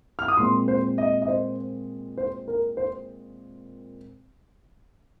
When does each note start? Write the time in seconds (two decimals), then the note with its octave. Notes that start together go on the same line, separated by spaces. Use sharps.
0.19 F6
0.28 D#6
0.37 A#2 G#3 C4 C6
0.68 C5
0.98 D#5
1.22 D#5
1.28 C5
2.17 C5
2.48 A#4
2.77 C5